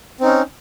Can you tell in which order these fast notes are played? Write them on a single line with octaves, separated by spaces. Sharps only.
C4 D#4 C#4